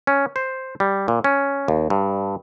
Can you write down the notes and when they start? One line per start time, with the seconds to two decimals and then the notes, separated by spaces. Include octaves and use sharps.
0.07 C#4
0.36 C5
0.80 G3
1.08 A#2
1.24 C#4
1.68 D#2
1.90 G2